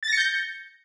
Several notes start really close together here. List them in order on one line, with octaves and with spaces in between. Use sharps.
A6 A#6 C#7 G6